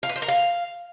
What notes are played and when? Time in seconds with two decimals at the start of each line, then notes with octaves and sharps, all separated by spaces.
0.03 F4
0.09 B4
0.16 C5
0.22 A#4
0.28 F5